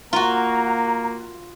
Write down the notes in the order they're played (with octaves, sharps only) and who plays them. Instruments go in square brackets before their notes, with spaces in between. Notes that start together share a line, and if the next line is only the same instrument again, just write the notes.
[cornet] A#3 [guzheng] F4 F#4 [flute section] A#5